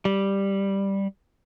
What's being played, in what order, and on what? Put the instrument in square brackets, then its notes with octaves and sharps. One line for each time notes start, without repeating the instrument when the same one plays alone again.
[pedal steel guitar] G3